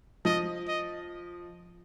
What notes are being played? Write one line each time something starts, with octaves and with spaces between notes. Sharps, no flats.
F3 D#5
D#5